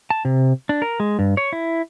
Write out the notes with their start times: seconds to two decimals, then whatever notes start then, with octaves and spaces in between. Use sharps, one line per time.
0.10 A5
0.25 C3
0.69 D4
0.82 A#4
1.00 G#3
1.19 G2
1.37 C#5
1.53 E4